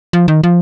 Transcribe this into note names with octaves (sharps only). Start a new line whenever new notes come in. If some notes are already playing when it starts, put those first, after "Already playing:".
F3
D#3
F3